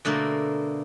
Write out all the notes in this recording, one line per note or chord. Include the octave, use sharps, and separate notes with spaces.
B2 D3 A3 A#3